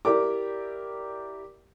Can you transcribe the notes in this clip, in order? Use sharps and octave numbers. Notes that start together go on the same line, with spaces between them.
E4 G4 A#4 D5 D6